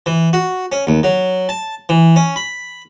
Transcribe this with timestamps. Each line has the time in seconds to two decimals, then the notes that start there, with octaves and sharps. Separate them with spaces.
0.06 E3
0.33 F#4
0.72 C#4
0.87 D#2
1.03 F#3
1.49 A5
1.89 E3
2.16 C#4
2.36 B5